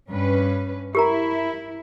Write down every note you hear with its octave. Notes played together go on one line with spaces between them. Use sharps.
G2 C#4 B4
E4 G4 A#4 A#5